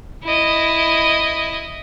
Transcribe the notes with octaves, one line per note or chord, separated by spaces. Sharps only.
E4 D#5